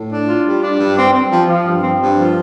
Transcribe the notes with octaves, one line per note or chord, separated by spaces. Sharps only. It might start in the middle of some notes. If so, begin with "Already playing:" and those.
Already playing: A2
D4
F4
G3
D4
G2
C4
C4
F3
F3
G2
C4
G2
F3